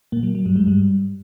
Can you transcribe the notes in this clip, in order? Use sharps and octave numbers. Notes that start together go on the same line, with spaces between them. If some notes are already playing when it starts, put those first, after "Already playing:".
A#2 A#3
F#3
F#3
G2 G3
G#2 G#3
G2 G3